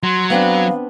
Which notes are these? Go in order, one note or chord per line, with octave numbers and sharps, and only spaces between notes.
F#3 C6
B3 C4 D4 F5